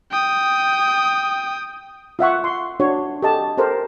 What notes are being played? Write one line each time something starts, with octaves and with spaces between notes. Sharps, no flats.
G5 D#6
F4 E5 F#5 C#6
C6 C#6
D4 F#4 C#5
G4 A4 D#5 A5
G4 A4 A#4 C5